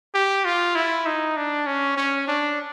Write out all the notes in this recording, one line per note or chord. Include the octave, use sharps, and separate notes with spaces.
G4
F4
E4
D#4
D4
C#4
C#4
D4